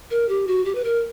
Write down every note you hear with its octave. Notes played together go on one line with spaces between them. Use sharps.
A#4
G4
F#4
G4
B4
A#4